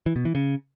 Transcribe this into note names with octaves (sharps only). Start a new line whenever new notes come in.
E3
B2
E3
C#3